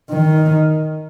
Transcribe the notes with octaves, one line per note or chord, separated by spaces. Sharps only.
D#3